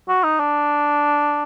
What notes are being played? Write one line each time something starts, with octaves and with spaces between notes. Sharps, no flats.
F#4
D#4
D4